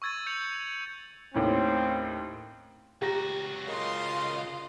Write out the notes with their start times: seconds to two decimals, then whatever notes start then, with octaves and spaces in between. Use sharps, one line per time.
0.02 C#6 E6 G#6 A6 D#7
0.26 G6 C#7 F7 F#7
1.34 D#2 A2 C4 C#4
3.02 C#2 F#4 G4 A#5 A#6
3.68 C#3 F4 A#4 D#5 F5 C6